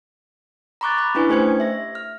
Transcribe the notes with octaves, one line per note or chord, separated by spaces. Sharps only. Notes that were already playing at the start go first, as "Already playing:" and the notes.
A#5 B5 C#6 D6 F#6 A6
B5
C#4 D4 E4 B4 G#5 C#6
A3 G4 C5 G#6 C#7
E5 A#6
F6